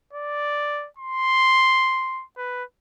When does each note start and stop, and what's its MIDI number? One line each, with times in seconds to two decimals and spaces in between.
0.13 0.88 74
0.99 2.24 84
2.37 2.63 71